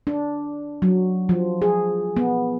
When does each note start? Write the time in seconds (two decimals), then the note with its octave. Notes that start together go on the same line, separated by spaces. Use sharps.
0.07 D4
0.82 F#3
1.29 F3
1.62 G#4
2.17 B3